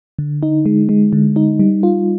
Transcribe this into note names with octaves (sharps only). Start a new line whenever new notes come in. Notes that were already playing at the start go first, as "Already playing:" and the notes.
D3
D#4
G#3
G#3
D3
D#4
G3
F4